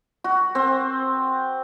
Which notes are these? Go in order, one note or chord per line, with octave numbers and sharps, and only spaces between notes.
F#4
C4